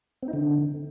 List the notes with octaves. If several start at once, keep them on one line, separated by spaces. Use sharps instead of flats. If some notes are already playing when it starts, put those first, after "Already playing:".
C4
D#4
D3